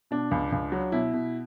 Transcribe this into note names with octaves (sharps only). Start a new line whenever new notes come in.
B2 D4
C#2
C#2
F#3
B2 E4
B2